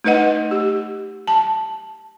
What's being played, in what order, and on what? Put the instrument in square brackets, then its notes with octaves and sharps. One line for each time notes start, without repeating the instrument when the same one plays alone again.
[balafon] A3 D#4 B4 D#5 F#5
G4
A5